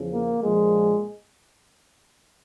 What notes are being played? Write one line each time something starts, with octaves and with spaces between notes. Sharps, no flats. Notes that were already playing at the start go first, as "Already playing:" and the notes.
Already playing: E2 C#3 F3
A#3
A#1 A#2 F3 G#3